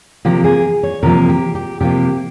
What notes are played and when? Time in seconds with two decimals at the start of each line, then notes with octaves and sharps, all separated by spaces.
0.25 C3 F3 A#3 G4
0.44 G#4
0.83 C#5
1.03 C3 F3 A#3 A#4
1.29 G4
1.55 G4
1.81 C3 F3 A#3 G4